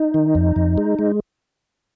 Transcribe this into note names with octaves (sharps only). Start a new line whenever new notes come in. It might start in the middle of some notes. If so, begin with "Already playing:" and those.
Already playing: D#4
D#3
F2
F2
G#3
G#3